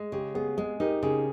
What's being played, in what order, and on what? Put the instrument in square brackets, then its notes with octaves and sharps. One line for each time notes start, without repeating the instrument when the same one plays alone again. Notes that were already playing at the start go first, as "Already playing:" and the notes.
Already playing: [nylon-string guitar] G#3
[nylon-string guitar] C#3 [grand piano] G4
[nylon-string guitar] B3 [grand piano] G#4
[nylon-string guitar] G#3 [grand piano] G#4
[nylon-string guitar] D#4 [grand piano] G4 A#4
[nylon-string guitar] C#3 [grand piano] G#4